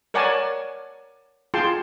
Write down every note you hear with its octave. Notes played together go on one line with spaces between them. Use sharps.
A#4 C#5 D5 F#5 G#5 A5
F4 G#4 G5 A5 C6